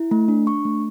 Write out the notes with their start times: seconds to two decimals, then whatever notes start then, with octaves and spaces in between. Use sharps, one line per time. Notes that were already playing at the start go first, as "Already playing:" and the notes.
Already playing: E4
0.11 A3
0.28 D4
0.46 D4 C#6
0.65 A3